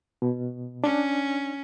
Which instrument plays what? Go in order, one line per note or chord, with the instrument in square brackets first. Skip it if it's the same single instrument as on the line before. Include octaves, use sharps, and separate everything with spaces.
[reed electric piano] B2
[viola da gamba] C#4 [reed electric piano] D4